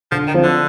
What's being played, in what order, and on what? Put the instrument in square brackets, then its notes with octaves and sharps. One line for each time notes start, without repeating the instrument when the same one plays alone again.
[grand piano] D3 [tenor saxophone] F3
[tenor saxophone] D#3
[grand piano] F3 C4 F4
[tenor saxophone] D3